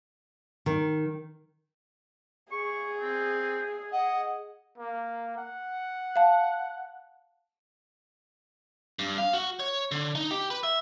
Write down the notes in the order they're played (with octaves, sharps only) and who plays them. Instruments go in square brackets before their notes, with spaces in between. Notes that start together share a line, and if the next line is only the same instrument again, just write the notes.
[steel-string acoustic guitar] D#3
[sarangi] G#4 [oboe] C#6
[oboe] C4
[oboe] D#5 [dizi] F#5
[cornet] A#3
F#5
[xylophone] F5 A5
[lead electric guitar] G2
F5
F#4
C#5
D3
D#4
G4
B4
E5